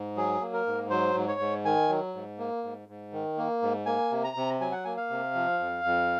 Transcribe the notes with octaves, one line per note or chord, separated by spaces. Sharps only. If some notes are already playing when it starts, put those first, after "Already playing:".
Already playing: G#2
F#3 G#4
A#3
A#4
G#2
F#3 C5
G#2
C#5
G#2
D#3 G#5
F#3
G#2
A#3
G#2
G#2
D#3
A#3
G#2
A#3 G#5
C3
A#5
C3
F#3 G#5
F#5
A#3 G#5
F5
C3
F3
F2
F2